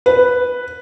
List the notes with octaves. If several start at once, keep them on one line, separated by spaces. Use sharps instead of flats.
B4